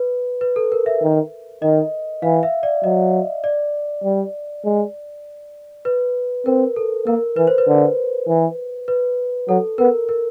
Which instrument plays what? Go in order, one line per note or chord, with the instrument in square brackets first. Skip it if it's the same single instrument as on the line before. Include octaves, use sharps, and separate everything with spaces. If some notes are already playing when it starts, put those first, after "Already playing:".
Already playing: [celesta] B4
B4
A4
A#4
E5
[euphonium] D#3
[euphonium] D#3 [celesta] D#5
[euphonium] E3 [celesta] F5
[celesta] E5
D5
[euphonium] F#3 [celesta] D#5
[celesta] D5
[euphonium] G3
G#3
[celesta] B4
[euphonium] C4 [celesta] A#4
[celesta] A4
[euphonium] A#3 [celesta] A#4
[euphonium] E3 [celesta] B4
[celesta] C5
B4
[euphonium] D3
E3
[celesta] B4
[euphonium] F#3 [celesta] A4
[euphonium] B3 [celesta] A#4
[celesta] A#4